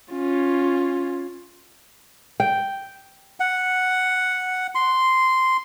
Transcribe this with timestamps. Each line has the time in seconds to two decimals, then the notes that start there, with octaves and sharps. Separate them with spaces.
0.12 C#4 F4
2.40 G5
3.40 F#5
4.75 C6